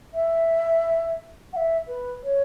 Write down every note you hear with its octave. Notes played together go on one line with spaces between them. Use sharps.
E5
F#5
E5
B4
C#5